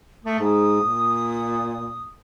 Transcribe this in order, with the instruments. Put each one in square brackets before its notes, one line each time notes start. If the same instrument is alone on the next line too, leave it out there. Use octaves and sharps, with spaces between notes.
[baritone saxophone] A3 [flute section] D#6
[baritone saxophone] G#2
A#2